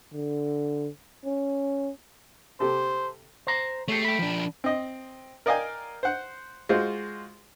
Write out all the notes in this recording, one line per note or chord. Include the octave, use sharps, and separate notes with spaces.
D3
C#4
C3 G4 A4 C5
C5 A#5
A3 G4 G#4 C#5
G5 B5
F3 D4
C4 D#5
A#4 D5 D#5 F5 G5 G#5
C5 F#5
G#3 F4 F#4 C5